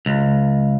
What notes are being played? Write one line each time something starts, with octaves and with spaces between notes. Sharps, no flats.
C#2